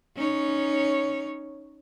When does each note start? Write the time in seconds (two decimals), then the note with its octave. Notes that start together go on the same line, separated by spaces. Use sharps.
0.16 C#4 D#4 C#5